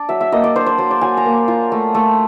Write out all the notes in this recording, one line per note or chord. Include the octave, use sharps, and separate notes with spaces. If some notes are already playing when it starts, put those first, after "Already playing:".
Already playing: D4 D5
F#3 E5
E5
A#3 D#5
D5
D4 C5
C5
F#3 C5
D5
F#3 G#5
A#5
A#3
F4
A3
A3